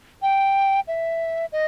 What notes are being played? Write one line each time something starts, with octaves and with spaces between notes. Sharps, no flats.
G5
E5
D#5